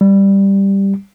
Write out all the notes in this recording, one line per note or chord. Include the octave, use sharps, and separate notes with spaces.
G3